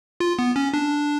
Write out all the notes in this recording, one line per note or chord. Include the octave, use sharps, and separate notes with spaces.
F4
B3
C#4
D4